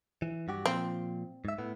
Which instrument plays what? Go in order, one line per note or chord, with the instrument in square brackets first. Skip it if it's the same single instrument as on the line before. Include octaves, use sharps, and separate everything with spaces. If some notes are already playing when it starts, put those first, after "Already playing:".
[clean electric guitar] E3
G2 F#4 G4
[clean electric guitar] A#2 F3 F5 [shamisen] C4
[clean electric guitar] G#2 E5
A2 B3